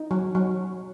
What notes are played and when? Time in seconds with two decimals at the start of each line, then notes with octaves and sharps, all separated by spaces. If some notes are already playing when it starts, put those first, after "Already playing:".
Already playing: D#4
0.11 F#3
0.35 F#3